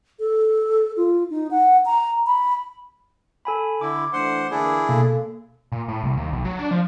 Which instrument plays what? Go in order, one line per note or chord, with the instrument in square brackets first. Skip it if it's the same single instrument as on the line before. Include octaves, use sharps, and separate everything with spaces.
[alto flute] A4
F4
D#4
F#5
A#5
B5
[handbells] A4 G#5 B5
[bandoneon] D3 E4 [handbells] D6
[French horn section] E3 A3 D4 [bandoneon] C5 F#5 C6
[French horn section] D3 E3 A#3 [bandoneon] D4 E4 G#4
[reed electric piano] B2 [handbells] A#3 [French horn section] A4
[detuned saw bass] A#2
A2
C2
D#2
B1
F#3
D4
F3